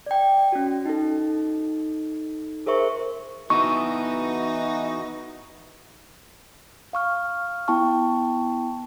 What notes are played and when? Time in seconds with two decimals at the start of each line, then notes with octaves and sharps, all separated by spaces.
0.06 D5 G5
0.52 C#4 F#4
0.86 D#4 A4
2.66 G#4 A#4 C5 E5 C#6
3.50 E3 B3 D#4 F#4 A4 D#5 C#6
6.93 F5 C#6 F6
7.68 B3 E4 G5 A5 C#6